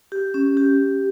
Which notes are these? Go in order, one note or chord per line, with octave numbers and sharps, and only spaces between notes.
G4
C#4
G4